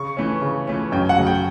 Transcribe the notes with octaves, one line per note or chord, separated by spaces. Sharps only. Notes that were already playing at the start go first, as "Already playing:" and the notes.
Already playing: C#3 C#6
E3 A3 C#4
C#3
E3 A3 C#4
F#2 G5
F#5
C#3 F#3 A3
G5